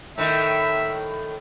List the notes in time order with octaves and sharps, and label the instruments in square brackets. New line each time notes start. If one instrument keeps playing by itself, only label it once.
[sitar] A2 D#3 [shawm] E5